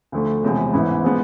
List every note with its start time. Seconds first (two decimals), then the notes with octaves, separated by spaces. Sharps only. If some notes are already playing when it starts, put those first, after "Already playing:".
0.12 D2 D3 F3 A3
0.43 E1 E2 C3 F3 G#3
0.73 A1 G#2 E3 B3 E4
1.04 F3 G#3 B3